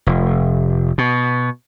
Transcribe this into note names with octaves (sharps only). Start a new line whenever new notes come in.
F1
B2